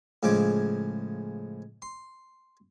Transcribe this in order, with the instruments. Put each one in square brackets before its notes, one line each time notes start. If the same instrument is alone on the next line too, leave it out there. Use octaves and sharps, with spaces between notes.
[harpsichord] A2 C#3 F3 G#3 D6
C6